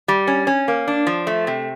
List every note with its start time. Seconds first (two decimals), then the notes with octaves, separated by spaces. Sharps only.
0.08 G3
0.27 C#4
0.47 C#4
0.68 A#3
0.88 D4
1.07 F3
1.27 A3
1.47 C3